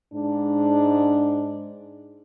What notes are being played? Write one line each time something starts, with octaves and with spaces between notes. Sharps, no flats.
G#2 D4